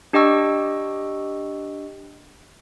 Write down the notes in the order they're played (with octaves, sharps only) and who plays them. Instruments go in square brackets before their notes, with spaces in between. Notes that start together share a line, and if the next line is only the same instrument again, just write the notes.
[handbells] D4 G4 D#5 G5 C#6 E6